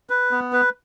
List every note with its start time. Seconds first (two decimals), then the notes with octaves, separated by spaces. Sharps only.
0.10 B4
0.31 B3
0.53 B4